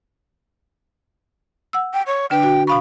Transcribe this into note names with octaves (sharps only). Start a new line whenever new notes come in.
F#5 E6
G5
C#5
D3 D4 B4 G5
F#4
B2 F5 B5 C#6